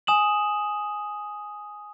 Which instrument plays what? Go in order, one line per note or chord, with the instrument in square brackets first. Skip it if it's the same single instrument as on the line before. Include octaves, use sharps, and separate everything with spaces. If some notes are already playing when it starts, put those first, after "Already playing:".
[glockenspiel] G#5 D#6 E7 F#7